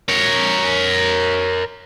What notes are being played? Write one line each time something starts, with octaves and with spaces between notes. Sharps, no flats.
A#4 C#5